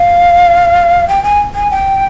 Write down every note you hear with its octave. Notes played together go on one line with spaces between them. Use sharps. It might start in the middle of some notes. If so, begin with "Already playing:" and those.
Already playing: F5
G5
G#5
G#5
G5